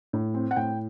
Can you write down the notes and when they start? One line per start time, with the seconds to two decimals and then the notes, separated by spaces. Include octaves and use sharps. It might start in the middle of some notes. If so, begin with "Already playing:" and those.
0.13 A2
0.34 C4
0.51 F#5
0.56 A2 G5